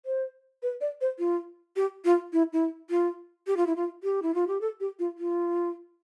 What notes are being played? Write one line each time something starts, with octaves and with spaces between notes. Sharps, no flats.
C5
B4
D5
C5
F4
G4
F4
E4
E4
F4
G4
F4
E4
F4
G4
E4
F4
G4
A4
G4
F4
F4